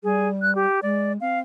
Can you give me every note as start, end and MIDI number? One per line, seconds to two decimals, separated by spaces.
0.03 0.65 55
0.03 0.29 68
0.42 0.53 90
0.55 0.80 67
0.82 1.17 56
0.82 1.13 74
1.21 1.42 60
1.21 1.40 77